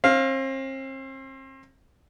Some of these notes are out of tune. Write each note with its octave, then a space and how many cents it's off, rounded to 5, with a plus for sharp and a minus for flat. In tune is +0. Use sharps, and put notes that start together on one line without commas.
C4 +40 F5 +0